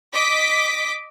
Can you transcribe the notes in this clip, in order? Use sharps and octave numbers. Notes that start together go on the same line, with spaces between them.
D#5 D6 B6